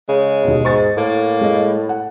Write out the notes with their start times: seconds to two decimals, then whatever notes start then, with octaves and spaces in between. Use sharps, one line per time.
0.09 C#3 G#3
0.44 D#2 B2
0.65 G#2 C#6 A6
0.98 A2 A#3
1.41 G#3 D#5
1.89 F#5